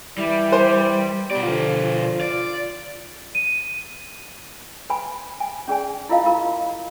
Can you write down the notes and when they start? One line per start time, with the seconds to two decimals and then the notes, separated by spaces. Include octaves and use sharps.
0.18 E3 G3 E4 D5
0.52 C5
1.31 B2 G3 B3 D5
1.43 D3 F3 F4
2.21 D5
3.35 D#7
4.90 B4 G#5 B5
5.40 G#5
5.68 C#4 G#4 D5 G#5
6.09 E4 F4 A#4 D#5 F5
6.23 E4 F4 G4 A#4 B5